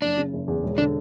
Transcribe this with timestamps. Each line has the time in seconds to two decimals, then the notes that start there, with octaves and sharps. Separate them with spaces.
0.02 F#1 D4
0.17 C#3
0.33 F#1
0.48 E2
0.63 E1
0.78 D3 D4